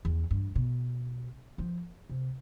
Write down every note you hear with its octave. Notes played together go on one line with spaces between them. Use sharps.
E2
G2
B2
F3
C3